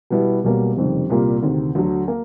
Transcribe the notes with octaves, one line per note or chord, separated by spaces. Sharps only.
B2 G3 B3 E4
B1 B2 G3 A#3
F#1 F2 C3 D#3 G3
C2 A#2 G3 A#3
D2 C3 D#3
D2 D3 F#3
A#3